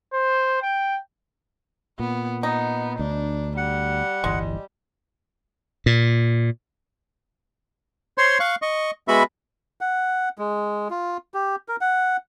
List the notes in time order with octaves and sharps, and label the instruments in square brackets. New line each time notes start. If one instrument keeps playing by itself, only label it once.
[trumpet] C5
G5
[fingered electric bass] A#2 [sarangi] B3
[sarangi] B3 [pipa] D#4
[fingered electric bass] D2 [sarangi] D4
[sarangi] G3 [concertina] F#5
[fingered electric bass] D1 G1 E3 [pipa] G#3
[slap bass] A#2
[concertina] C5 C#5 C6
F5 C#6 F#6
D#5 C#6
G#3 B3 F#4 E5 B5
[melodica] F#5
G#3
F4
G4
A#4
F#5